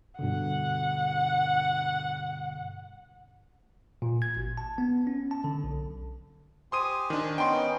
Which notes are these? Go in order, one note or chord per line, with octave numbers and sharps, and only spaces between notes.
G2 B2 D3 F#5
A#2
G#6
G#1
A5
B3
C#4
A5
D3
B1
G4 C5 G#5 C6 D#6 D#7
D#3 D4
B3 C#4 D#4 G5 C6